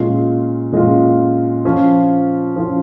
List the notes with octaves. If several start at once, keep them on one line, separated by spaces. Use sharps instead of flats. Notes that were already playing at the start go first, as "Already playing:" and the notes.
Already playing: A#2 G#3 C#4 F4
A#2 G#3 C#4 F4
F3 C#4 F4
F3 C#4 F4